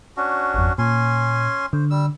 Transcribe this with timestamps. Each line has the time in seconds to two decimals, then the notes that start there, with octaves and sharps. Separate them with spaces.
0.17 C#4 D4 F#4
0.54 G#1 F2
0.78 A#2 C#4 G#5 C6
1.73 D3 C5
1.91 G3 E6